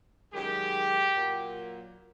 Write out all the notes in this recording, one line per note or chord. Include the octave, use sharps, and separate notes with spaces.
F#2 D#3 G#3 G4
A#2 F#3 A#3